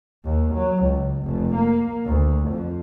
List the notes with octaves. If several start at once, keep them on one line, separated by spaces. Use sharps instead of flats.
D#2
F#3
C#2
F1
A#3
D2
F2